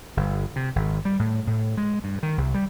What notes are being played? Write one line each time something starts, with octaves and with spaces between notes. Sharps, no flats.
G1
C3
G#1
G3
A2
A2
G#3
G2
D#3
C2
G3